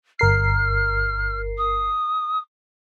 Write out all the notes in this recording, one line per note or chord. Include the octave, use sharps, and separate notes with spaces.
G1 A#4 F6 C7
D#6